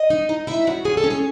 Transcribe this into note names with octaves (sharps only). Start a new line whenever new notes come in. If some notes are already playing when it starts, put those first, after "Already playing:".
Already playing: D#5
D#4
D#4
E4 E5
C#3 F#4
C#3 G#4
A4
C#4
G#4